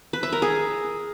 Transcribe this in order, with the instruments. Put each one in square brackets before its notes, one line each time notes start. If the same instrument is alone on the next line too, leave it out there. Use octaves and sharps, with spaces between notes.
[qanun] B4
E5
A#4
G#4